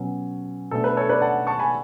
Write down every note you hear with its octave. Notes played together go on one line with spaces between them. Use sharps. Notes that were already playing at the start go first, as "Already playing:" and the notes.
Already playing: B2 F#3 C#4
B2 A3 D4 A4
B4
A4 C#5
B4 D5
F#5 A5
A5 C#6
G#5 B5